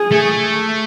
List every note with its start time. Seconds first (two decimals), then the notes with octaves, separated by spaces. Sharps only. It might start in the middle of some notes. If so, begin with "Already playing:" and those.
Already playing: G#4
0.12 A3